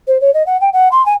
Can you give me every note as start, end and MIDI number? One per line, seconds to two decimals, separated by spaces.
0.07 0.20 72
0.21 0.33 73
0.34 0.45 75
0.46 0.59 78
0.61 0.69 79
0.73 0.89 78
0.92 1.04 84
1.06 1.14 80